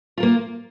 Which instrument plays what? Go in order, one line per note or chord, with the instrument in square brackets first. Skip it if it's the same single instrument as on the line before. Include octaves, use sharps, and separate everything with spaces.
[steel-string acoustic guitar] F4
A#4
A#3